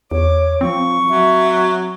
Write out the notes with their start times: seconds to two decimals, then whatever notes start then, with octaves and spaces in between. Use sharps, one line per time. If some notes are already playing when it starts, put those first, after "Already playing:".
0.11 E2 C#5 D6
0.61 F3 C4 C#6
1.09 F#3 E5